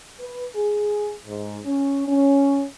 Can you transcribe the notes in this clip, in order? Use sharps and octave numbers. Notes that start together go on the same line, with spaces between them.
B4
G#4
G#2
C#4
C#4